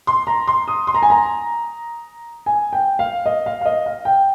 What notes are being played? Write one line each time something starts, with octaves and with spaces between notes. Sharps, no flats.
C6
A#5
C6
D#6
C6
A#5
G#5
A#5
G#5
G5
F5
D#5
F5
F5
D#5
F5
G5